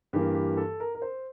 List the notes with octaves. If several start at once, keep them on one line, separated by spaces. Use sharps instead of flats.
G2 E3 A#3 G4
G4
A4
A#4
A#4
C5